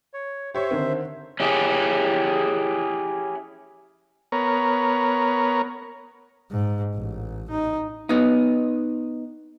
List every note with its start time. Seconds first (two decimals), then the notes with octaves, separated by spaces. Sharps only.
0.14 C#5
0.55 G4 C5 C#5 E5 C#6
0.71 D3 D#3 C4
1.40 C#4 E4 G4 G#4
4.32 B3 A#4 C#5
6.51 G#2
6.94 A1
7.50 D#4
8.09 B3 D#4